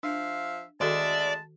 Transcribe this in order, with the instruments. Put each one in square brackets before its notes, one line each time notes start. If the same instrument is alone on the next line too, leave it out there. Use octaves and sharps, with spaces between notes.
[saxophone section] F3 E5 F5 [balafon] D4
[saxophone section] D2 G#3 E5 [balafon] D#3 F#4 A4 [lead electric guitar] D5 [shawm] A5